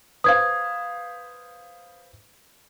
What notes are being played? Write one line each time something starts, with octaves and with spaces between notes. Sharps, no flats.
B4 C5 F5 D#6 G#6